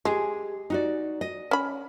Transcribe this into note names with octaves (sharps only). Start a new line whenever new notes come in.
G#3 G4 G#4
D#4 F#4 D5
D#5
C#4 B5